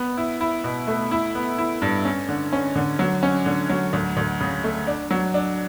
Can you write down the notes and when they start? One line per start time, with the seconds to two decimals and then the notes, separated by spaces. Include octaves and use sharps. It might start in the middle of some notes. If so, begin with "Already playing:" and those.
Already playing: B3
0.17 E4
0.41 E4
0.64 B2
0.87 A3
1.11 E4
1.35 B3
1.58 E4
1.82 G2
2.05 C#4
2.29 D3
2.53 C#4
2.76 D3
2.99 F#3
3.23 C#4
3.46 D3
3.69 F#3
3.93 D2
4.17 D2
4.41 C#3
4.64 A3
4.87 D4
5.11 F#3
5.34 D4